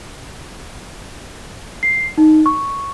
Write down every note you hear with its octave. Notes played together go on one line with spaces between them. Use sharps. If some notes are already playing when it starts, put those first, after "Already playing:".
C7
D#4
C#6